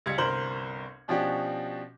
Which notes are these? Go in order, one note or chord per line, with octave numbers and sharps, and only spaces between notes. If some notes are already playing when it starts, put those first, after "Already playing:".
C#2 G3 G#6 C#7
G1 C2 A#4 C5 C6 F#7
B2 F3 C#4 D4 F#4 G4